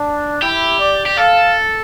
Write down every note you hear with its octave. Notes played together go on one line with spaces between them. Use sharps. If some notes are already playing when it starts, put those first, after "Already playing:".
Already playing: D4
E4 G4
D5
G4
A4 F5